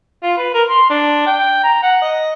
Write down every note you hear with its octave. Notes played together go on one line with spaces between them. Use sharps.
F4
B4
A#4
C6
D4
G5
A#5
F#5
D#5